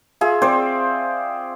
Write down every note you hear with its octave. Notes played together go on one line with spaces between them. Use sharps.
F4 G#4 E5
C4 C5 D5